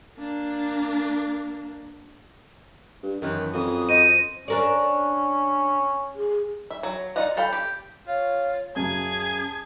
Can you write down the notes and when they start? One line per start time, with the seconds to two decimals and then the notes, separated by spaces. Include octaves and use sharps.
0.18 A#3 D4
3.03 G2
3.22 F#2 D#3 E3 B3
3.54 F2 D#5 D#6
3.89 C5 D#5 D#7
4.48 C#4 D4 A#4 D5
6.16 G#4
6.70 E5
6.83 F#3
7.16 D#4 F4 D5 D#5 F#5
7.37 A4 F5 G5 B5
7.53 G4
8.07 F4 C#5
8.76 F#2 C#3 G#4 A5 G#6